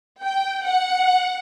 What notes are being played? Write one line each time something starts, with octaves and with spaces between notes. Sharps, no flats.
G5
F#5